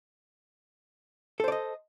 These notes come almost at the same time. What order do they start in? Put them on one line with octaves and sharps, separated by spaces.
A4 C5 D5 D#5